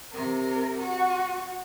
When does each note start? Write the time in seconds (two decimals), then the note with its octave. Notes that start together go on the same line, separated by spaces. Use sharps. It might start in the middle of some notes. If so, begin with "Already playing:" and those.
0.12 C3 A#4
0.79 F#4